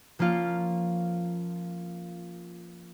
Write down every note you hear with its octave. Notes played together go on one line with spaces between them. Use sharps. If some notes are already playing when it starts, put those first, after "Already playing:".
F3 A#3 C#4 F4